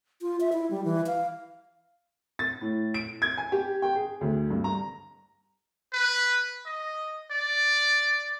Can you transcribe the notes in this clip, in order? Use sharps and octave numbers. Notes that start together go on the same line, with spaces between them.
F4
E5
E4
G3
E3
F5
A6
A2
D7
G#6
G#5
G4
G5
G#4
D2
G2
A#5
B4
D#5
D5